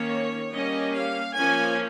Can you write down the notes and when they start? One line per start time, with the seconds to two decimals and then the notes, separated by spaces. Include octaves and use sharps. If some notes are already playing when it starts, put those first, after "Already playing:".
Already playing: D#3 A#3 C#4 C#5
0.53 G3 A#3 C#4 D#5
0.95 F5
1.34 F3 A#3 C#4 G#5